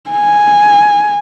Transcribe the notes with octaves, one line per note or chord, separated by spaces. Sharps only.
G#5